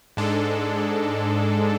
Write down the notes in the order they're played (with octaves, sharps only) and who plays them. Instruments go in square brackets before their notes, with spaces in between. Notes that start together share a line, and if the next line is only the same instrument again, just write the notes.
[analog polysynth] G#2 G#3 D4 A4